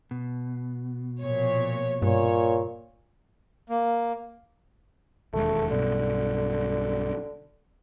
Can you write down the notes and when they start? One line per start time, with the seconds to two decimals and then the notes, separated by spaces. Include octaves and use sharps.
0.11 B2
1.22 A#2 F3 C#5
2.02 G2 A#2 C#5
3.69 A#3
5.34 E1 D#2 G#3 A3
5.71 B1 G2 B2 D3